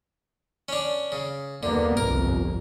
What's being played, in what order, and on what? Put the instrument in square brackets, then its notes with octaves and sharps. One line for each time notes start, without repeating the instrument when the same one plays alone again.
[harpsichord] C#4 D4
C#3
[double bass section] D#2 A#3 B3 [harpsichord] D3
[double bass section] G1 C2 F2 [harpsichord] A#4